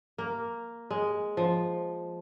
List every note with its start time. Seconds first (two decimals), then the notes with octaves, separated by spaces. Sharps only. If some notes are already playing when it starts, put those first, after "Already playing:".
0.18 A#3
0.90 G#3
1.37 F3